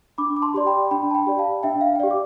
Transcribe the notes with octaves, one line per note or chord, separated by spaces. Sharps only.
D4 B5 D6
D6
A5 C6
G4 D5 C6
G5 B5
D4 G5 B5
A5
G5 B5
G4 D5
F5 A5
D4 E5 G5
F5
G5
G4 D5 F5
D6